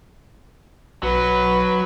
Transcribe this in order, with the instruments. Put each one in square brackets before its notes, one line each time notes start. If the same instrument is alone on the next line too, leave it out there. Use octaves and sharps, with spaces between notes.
[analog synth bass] B1 [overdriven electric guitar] F#3 [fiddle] B4